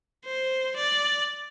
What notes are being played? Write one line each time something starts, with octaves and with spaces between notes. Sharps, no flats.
C5
D5